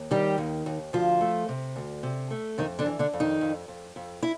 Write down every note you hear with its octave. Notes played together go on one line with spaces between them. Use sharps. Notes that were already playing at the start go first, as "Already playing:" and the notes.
Already playing: D#2
D#3 G3 G4
D#2
D#2
D2 F3 F4
A3
C3
D2
C3
A3
F2 D#3 D#4
D3 D4
E3
D3 D4
F2
D#3 D#4
F2
F2
F2
E4